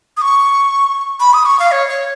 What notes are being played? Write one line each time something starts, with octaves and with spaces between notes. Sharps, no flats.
D#6
C#6
B5
D#6
C#6
F5
C#5
C#5